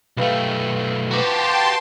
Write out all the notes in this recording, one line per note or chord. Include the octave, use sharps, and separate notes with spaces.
B1 A3 G4 B4 F5
F#4 G4 B4 C5 G5 A5 A#5 C6